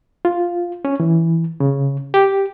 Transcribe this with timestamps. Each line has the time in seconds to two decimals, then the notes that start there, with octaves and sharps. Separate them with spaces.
0.25 F4
0.85 C#4
1.00 E3
1.60 C#3
2.14 G4